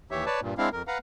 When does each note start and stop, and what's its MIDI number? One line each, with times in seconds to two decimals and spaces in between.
0.11 0.25 39
0.11 0.25 52
0.11 0.25 67
0.11 0.25 73
0.11 0.25 76
0.26 0.40 71
0.26 0.40 73
0.26 0.40 74
0.26 0.40 81
0.41 0.54 43
0.41 0.54 46
0.58 0.69 56
0.58 0.69 60
0.58 0.69 62
0.58 0.69 64
0.58 0.69 77
0.72 0.82 41
0.72 0.82 70
0.87 0.98 71
0.87 0.98 77
0.87 0.98 78
0.87 0.98 82